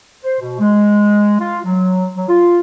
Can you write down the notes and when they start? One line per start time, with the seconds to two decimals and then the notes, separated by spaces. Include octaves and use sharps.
0.24 C5
0.40 B2
0.60 G#3
1.40 F4
1.65 F#3
2.15 F#3
2.28 F4